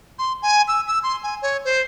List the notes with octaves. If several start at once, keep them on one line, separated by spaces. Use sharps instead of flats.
C6
G#5
E6
E6
C6
G#5
C#5
C5